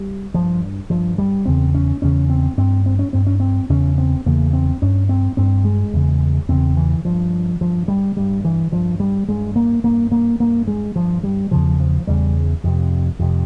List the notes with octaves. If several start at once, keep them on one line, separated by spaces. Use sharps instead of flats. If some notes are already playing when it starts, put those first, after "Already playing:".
Already playing: G3
G2 F3
G2 F3
G3
E2 C#3 C4
C#4
E2 C#3 C#4
C4
G2 C4
C4
C#4
G2 C4
C#4
C4
E2 C#3 C#4
C4
E2 C#3 A#3
C4
G2 C#4
C4
G2 C4
G#3
E2 C#3
E2 C#3 C4
E3
G2 F3
G2 F3
G3
G2 G3
E3
G2 F3
G3
G2 G#3
A#3
G2 A#3
A#3
G2 A#3
G#3
G2 F3
G3
E2 C#3 F3
F3
E2 C#3 G3
F2 C3
F2 C3